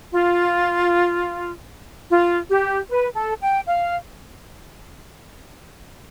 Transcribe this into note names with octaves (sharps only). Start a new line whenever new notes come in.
F4
F4
G4
B4
A4
G5
F5